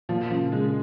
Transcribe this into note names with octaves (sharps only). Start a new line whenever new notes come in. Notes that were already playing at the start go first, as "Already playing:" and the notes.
A#2 F3
C#3 F3
C#3 G#3